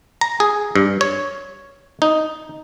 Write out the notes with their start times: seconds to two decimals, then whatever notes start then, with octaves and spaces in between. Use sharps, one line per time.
0.21 A#5
0.40 G#4
0.76 G2
1.01 C#5
2.02 D#4